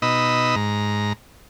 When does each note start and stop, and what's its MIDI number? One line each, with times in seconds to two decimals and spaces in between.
0.02 0.56 47
0.02 0.56 63
0.02 0.56 75
0.02 0.56 83
0.02 0.56 88
0.56 1.13 44
0.56 1.13 82